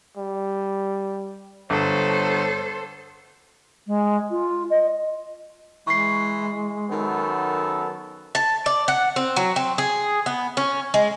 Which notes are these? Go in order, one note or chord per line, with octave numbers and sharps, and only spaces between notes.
G3
G1 A4 C5 C#5
G#3
F4
D#5
E3 G#3 C#6 C7
F#2 D#3 B3 A4
A5
D5
F#5
C4
F#3
C4
G#4
B3
C#4
G#3